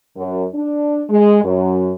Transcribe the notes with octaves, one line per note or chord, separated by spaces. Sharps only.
F#2
D4
G#3
F#2